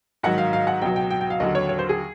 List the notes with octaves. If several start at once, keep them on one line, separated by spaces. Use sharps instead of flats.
G#2 D#3 F#3 F#5
F5
F5
F#5
C#2 B2 F#3 G5
G5
G5
G5
F5
D#2 D3 F#3 D#5
C#5
C#5
C5
G#4